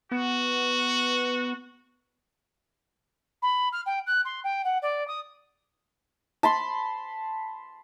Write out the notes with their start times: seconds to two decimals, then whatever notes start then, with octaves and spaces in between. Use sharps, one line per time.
0.12 B3 F#4
3.42 B5
3.72 F6
3.86 G5
4.06 F#6
4.25 C6
4.44 G5
4.64 F#5
4.82 D5
5.08 D#6
6.43 A5 B5 C6